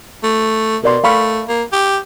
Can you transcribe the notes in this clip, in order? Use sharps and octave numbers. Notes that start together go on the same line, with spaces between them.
A3
B2 A#4 D5 C6
A3 F5 B5 C#6
A#3
G4